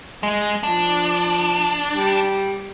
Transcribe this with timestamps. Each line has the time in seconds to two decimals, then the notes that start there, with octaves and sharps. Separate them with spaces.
0.23 G#3
0.63 F3 D4
1.92 G3